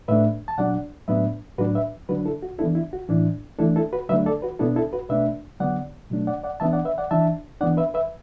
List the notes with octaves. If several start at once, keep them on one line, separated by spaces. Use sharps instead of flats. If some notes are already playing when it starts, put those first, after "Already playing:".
A2 A3 D4 B4 E5
A5
B2 F#3 D4 D5 F#5
A2 F#3 B3 D4 B4 E5
A2 F#3 D4 F#4 B4
B4 E5
D3 F#3 D4 F#4 B4
E4 A4
F#4
E3 B3 D4 E4 A4
E4
F#4
A2 E3 D4 E4
E3 A3 D4 E4 A4
E4 A4
F#4 B4
D3 F#3 A3 D4 B4 E5
A4 D5
F#4 B4
B2 B3 D4 E4 A4
E4 A4
F#4 B4
B2 A3 D4 B4 E5
D3 F#3 B3 D5 F#5
B2 F#3 A3 D4
D5 F#5
D5 F#5
E3 B3 D4 E5 A5
D5 F#5
B4 E5
D5 F#5
E3 D4 E5 A5
E3 B3 D4 D5 F#5
B4 E5
B4 E5